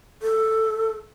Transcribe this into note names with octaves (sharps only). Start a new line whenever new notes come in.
A4